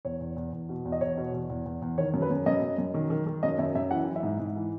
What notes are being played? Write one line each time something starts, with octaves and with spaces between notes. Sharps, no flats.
E2 C#5
E2
E2
E2
B2
E2
D#5
E2 C#5
B2
E2
E2
E2
E2
D#3 C#5
F#2
B4
F#2
F#2 D#5
F#2
F#2
D#3
D#3
D#3
F#2 D#5
F#2 E5
F#2 E5
E3 F#5
E3
E5
G#2
G#2
E3